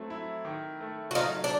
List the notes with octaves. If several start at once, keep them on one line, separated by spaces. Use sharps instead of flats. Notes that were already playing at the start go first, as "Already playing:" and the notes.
Already playing: F#3 A3 C4
E4
D#3
A3
F#4
F#3 D#4 F4
D4